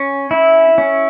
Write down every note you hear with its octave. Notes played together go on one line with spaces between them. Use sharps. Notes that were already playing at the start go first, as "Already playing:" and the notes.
Already playing: C#4
E4
C#4